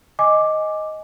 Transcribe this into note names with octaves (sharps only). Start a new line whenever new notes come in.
D#5 G#5 D6